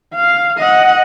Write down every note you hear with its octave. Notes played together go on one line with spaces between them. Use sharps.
F5
D#5 F#5